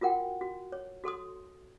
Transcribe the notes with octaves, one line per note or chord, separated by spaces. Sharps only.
F4 F#4 A#4 F#5 G5
F#4
C#5
F#4 A4 C6 D#6